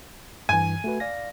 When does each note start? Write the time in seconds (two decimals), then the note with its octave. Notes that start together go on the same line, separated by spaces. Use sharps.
0.49 G2 E3 G#5
0.84 A3 F#4 B4
1.00 D5 F5 A#6